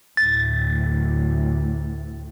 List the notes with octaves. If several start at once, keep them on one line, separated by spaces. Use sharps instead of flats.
D2 A2 A6